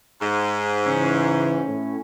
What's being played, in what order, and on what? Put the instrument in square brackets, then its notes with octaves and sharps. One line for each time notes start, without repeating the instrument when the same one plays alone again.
[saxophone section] G#2
[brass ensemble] C#3 E3 [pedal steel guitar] C#4
[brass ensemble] A2